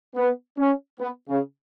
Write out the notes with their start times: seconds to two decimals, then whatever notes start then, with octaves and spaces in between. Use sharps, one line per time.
0.16 B3
0.58 C#4
1.00 B3
1.29 C#3